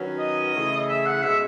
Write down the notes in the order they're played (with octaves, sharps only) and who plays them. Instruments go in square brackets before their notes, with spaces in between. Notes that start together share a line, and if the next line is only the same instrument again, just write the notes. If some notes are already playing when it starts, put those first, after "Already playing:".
Already playing: [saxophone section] D#3 F#3 C#4 F#4 B4
[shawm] D#5
[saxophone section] C#3 E3 A3 E4 G#4
[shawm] E5
F#5
[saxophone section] B2 G#3 C#4 G#4 [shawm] E5